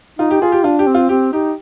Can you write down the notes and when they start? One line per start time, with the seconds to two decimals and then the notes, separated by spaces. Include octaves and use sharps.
0.19 D#4 F4
0.31 G4
0.41 F4 G#4
0.52 G4
0.64 D4 F4
0.79 G4
0.87 C4
0.95 F4
1.09 C4 G4
1.33 D#4 G4